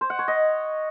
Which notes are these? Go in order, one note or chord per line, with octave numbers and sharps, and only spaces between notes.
C5
F#5
C#5
D#5